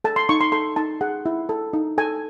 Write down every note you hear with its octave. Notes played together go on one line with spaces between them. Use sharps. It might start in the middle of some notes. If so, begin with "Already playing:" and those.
A4 A5
C6
D#4 C#6
C6
A4 C6
D#4 A5
G#4 F#5
E4
A4
D#4
A4 G#5